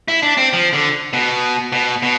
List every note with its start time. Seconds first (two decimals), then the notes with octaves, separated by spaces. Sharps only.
0.08 E4
0.23 D4
0.37 C4
0.53 F3
0.73 D3
1.13 B2
1.72 B2
2.03 B2